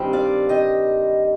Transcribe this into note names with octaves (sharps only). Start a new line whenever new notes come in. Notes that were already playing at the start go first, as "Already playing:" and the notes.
Already playing: G2 D#3 G3 C4
D5 F5
D#5 G5